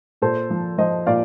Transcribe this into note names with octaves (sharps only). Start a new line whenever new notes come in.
A#2 A4 C5
F3
F3 C5 D#5
A#2 D5 F5